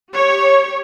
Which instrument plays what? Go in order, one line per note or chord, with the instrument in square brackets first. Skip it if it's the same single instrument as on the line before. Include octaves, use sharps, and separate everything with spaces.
[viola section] G4 C#5